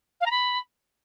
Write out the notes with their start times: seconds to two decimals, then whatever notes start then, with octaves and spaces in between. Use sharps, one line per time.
0.20 F5
0.25 A#5
0.30 B5